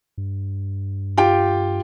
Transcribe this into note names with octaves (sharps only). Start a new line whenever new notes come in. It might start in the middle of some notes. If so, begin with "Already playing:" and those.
G2
F4 G4 G5